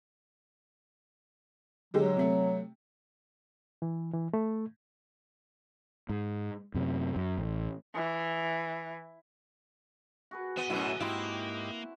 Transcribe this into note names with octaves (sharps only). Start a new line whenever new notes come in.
D3 F#3 G#3 G4
C3 A3
E3
E3
A3
G#2
F#2 C3
F#2
A1
E3
F#4 G#4 B4
B3 D#5 E5 F#5
F#2 B2 F#3 A3 E4 F#5 G#5
G#2 A#3 C4 E4 G4 D#5